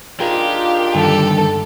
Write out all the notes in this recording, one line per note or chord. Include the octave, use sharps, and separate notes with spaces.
D4 D#4 F4 G4 G#4 A#4
G2 D3 D#3 A4